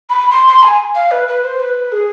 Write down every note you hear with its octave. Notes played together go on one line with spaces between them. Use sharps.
B5
C6
C6
G#5
F5
B4
B4
C5
B4
G#4